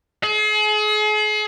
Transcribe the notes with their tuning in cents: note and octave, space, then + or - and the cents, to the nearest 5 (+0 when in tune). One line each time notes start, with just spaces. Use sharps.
G#4 +40